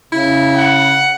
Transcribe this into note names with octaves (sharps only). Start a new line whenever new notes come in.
C#3 E4
F#5